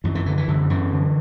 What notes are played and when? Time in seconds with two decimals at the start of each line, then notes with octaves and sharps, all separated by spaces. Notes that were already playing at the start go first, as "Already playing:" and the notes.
0.04 F#2 E3
0.15 E3
0.26 D3 E3
0.37 E3
0.48 F#2 D3
0.70 F#2 E3
0.92 D3